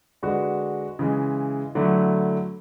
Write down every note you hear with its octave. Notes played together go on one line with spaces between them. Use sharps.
D3 G#3 D4 F#4 B4
C#3 E3 G#3
D3 F#3 A3 E4